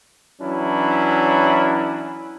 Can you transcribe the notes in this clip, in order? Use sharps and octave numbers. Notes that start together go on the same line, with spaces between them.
E3 F#3 C#4 D4 E4